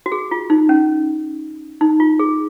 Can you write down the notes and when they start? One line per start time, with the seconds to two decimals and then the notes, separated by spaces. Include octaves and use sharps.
0.06 F#4
0.12 G#4
0.31 F4
0.50 D#4
0.69 C#4
1.81 D#4
2.00 F4
2.19 G#4